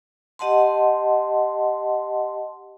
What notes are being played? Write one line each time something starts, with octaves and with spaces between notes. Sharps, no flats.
G4 D#5 F#5 A5 C6